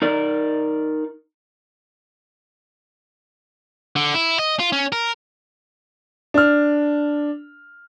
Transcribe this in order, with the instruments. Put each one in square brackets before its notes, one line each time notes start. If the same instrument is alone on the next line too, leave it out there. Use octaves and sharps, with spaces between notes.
[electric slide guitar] D#4 A#4 D5
[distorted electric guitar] D3
E4
D#5
F4
C#4
A#4
[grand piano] D4 F6